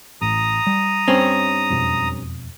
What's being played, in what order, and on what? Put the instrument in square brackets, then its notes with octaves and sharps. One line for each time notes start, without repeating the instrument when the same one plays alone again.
[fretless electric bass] A1 A2 [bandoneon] A#5 D#6
[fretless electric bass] G3
[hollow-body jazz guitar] G2 C4 C#4
[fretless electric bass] E1 F2 B2